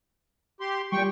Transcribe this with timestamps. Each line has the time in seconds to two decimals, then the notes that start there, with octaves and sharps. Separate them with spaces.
0.61 G4 C6
0.92 A#2 G3 G5 C#6